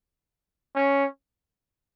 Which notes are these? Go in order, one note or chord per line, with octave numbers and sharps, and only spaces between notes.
C#4